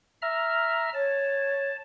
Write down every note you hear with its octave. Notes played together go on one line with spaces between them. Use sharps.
E5 A#5 F6
C#5 A5